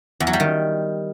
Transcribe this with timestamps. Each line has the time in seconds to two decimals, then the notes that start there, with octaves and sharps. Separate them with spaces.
0.20 E2
0.27 F#3
0.33 G3
0.40 D#3